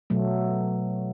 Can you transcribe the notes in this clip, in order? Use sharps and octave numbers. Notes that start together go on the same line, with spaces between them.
B2 F#3 A3